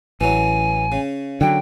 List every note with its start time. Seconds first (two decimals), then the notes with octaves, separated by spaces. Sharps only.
0.21 A1 E3 F#3 G#5
0.92 C#3
1.41 D3 F#3 G5